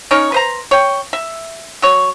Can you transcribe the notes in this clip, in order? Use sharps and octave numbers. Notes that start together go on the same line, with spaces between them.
C#4 D#4 A#4 C#5
B4 C5 A#5
C#5 G5
E5
F#3 C#5